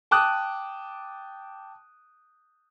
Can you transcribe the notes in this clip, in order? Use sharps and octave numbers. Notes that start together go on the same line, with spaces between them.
G5 A5 D6 D#6 F#6